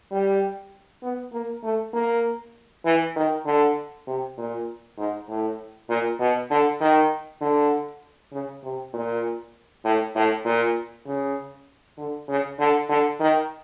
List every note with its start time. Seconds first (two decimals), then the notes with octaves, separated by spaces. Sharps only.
0.11 G3
1.03 B3
1.33 A#3
1.63 A3
1.94 A#3
2.85 E3
3.16 D#3
3.45 D3
4.07 C3
4.38 A#2
4.98 G#2
5.29 A2
5.89 A#2
6.20 B2
6.50 D3
6.80 D#3
7.41 D3
8.33 C#3
8.64 C3
8.93 A#2
9.84 A2
10.15 A2
10.45 A#2
11.07 C#3
11.98 D3
12.28 C#3
12.59 D3
12.89 D3
13.20 D#3